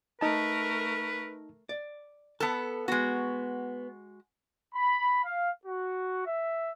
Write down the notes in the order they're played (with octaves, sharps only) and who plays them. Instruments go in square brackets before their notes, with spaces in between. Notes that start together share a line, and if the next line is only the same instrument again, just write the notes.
[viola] A3 A#4 [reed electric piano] D#4 A5 [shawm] B4
[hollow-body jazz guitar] D5
[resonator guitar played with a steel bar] B3 A4 [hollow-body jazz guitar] A5
[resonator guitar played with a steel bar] G#3 F#4 [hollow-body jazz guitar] B3
[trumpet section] B5
F5
F#4
E5